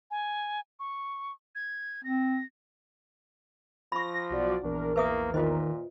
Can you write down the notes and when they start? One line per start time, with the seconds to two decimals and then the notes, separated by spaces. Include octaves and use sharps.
0.11 G#5
0.80 C#6
1.55 G#6
2.04 C4 A#6
3.92 F3 B5 C#6 A#6
4.30 B1 F#4 D5
4.63 A#1 E2 D4 A#4
4.96 A#3 B4 E5 D#6
5.34 A#2 D#3 F4 C5 D#5